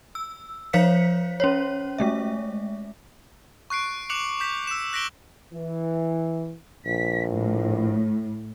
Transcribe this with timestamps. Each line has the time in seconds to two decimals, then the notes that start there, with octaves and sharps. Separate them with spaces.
0.15 E6
0.73 F3 C5 C#5 F5 B6 C#7
1.40 C#4 C5 C#5
1.98 G#3 A3 E5
3.70 C#6 F#6 C7 D7
4.10 D6 F#6 C#7 F7 F#7
4.40 D6 G6 B6
4.67 E6 E7
4.93 F#6 A#6 B6 D7 F#7 G7
5.53 E3
6.86 A#1 B6
7.29 A2